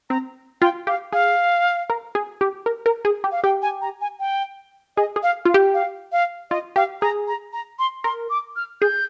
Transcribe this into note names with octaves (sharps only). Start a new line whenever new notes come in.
C4 A#5
F4 G5
G4 F5
G#4 F5
A#4
G#4
G4
A#4
A#4
G#4
G4
F5
G4 G5
G#5
A#5
G#5
G5
G#4 D#5
G#4
F5
F4 F5
G4
F5
F5
F4 D#5
G4 F5
G#4 A#5
A#5
A#5
C6
A#4 C6
D6
F6
G#4 G6